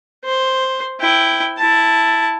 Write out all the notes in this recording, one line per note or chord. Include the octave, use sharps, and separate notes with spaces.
C5
E4 G5
E4 A5